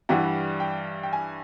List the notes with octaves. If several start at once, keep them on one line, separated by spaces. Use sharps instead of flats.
G2 E3 G3 F#5
G5
G5
G#5